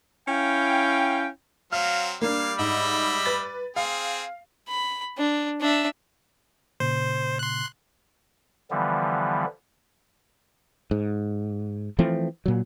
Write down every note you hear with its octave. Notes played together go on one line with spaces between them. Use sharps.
C#4 E4 F5 G5
F#3 C4 F5 F6
G3 A#3 D4 F5
G#2 D#5 E5 B5
B4 A6
C4 G#4 F5
B5
D4
D4 E5
A#2 C#3 C5
C6 F#6
D3 E3 F3 G3 B3
G#2
E3 F3 A3 C4
A#2 F#3